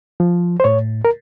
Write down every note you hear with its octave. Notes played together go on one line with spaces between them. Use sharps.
F3
C5
A2 C#5
A#4